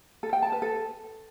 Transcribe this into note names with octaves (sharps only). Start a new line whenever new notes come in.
A4
G5
A5
B4
A4